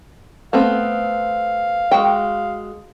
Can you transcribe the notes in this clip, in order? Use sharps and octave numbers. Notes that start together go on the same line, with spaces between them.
A3 B3 C4 F5
G#3 F#4 G5